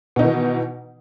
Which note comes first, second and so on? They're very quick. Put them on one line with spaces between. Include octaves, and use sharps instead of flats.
B2 D#4 D#3 E3